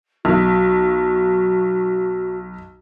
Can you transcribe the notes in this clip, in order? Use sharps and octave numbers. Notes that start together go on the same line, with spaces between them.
B1 F#4